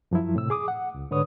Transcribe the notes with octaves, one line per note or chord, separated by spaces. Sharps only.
F#2 F3 F#3 E4
A2 C3 E6
G#4 D6 D#6
F#5
C#2
G#2 D3 B4 C#5 D#6